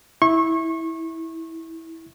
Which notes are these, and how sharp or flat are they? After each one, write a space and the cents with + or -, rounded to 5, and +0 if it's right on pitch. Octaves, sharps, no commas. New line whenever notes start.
E4 -15 C#6 -30